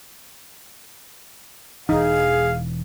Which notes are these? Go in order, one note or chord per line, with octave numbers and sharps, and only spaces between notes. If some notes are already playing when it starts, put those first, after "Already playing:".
E1 E3 D#4 G#4 F5